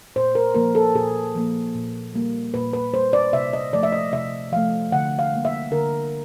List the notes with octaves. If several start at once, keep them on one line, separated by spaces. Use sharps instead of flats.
A#2 C5
A#4
F3 A#3 A#4
A4
A#2 G#4
F3 A#3
A#2
G3 A#3
A#2 B4
B4
G3 A#3 C5
D5
C3 E5
D#5
F3 A3 D5
E5
D#5
C3 E5
F3 A3 F5
D3 F#5
F5
G3 A#3
E5
D3 A#4